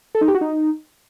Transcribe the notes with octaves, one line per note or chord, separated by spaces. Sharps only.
A4
D#4
G4
F#4
D#4